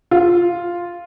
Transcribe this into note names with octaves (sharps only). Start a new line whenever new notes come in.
F4